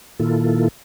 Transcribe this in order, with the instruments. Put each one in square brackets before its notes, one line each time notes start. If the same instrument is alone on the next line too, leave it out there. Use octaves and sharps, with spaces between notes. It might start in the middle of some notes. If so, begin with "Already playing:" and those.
[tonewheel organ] A#2 D#3 A#3 E4 F4 A4